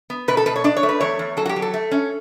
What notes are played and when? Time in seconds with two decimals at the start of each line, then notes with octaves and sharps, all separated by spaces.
0.10 B3
0.28 B2 B4
0.37 A4
0.46 B2 B4
0.56 C#5
0.64 D4 D5
0.77 C#5
0.83 A3
0.89 B4
1.00 E2 C#5
1.19 E2
1.37 F#3 A4
1.46 F#4
1.49 G4
1.56 F#3
1.62 A4
1.74 A3
1.91 C#4